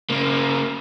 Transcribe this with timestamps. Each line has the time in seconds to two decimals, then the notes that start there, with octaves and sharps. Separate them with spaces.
0.10 C#3 A#3